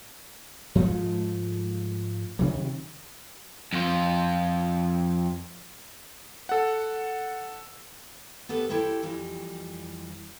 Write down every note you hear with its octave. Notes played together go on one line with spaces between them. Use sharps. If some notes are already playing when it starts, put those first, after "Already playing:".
G#2 F3 G#3 A3
C3 D#3 F#3
F2 F4
A4 F#5
B3 G4 A4 B4
E4 G4 A4 C5 G5
F2 E3 G3